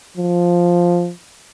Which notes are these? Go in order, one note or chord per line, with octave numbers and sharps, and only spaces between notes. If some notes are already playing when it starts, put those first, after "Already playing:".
F3